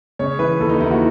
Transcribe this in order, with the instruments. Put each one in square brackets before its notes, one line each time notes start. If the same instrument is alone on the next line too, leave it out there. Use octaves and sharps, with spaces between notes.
[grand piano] C#3 C#5
E3 B4
D#2 A4
D#4
D#2 E4
F#4